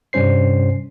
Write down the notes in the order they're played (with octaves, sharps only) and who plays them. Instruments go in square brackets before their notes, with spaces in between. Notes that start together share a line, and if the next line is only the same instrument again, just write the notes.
[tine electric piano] G2 C3 G3 C#4 C5 C7